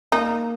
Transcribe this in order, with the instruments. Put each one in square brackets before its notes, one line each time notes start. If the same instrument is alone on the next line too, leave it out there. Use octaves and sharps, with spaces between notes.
[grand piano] A#3 [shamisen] D#4